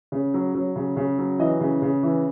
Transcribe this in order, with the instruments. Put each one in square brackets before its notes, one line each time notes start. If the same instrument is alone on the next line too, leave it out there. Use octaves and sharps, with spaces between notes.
[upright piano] C#3
F#3
F#3
C#3
C#3
F#3
E3 D#5
C#3
C#3
E3